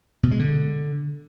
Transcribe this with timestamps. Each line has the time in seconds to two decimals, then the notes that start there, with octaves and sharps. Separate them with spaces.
0.23 B2
0.31 G#3
0.39 D3